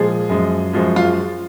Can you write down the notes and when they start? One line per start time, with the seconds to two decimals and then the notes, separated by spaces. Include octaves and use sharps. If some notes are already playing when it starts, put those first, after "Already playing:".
Already playing: A#2 F3 G#3 G#4
0.30 F#2 F3 G#3
0.73 F#2 F3 G#3
0.96 F4